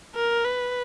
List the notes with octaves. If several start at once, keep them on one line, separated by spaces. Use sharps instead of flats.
A#4
B4